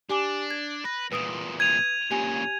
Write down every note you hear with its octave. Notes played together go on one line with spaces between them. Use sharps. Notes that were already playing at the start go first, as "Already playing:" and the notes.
D4 G4 G#5 D6
G#6
B4 A#6
E2 A#2 B4 D#6 D7
G#6 D#7 F7
A#2 C#3 G4 G#5